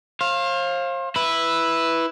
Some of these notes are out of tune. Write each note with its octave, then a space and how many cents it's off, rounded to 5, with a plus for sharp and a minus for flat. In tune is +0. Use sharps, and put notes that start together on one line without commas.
C5 +40 F5 +0
E4 +0 B4 +0